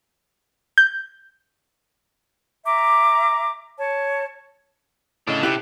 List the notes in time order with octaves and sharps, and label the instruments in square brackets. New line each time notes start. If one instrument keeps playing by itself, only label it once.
[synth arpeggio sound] G6
[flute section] E5 A#5 D6
C#5 A5
[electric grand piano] A2 C#3 D#5 [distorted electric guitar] D4 A4
[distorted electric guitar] C3 [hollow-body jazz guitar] E4 G4 A4 [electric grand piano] F#6